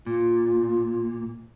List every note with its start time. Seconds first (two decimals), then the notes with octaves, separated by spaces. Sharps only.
0.06 A#2 F4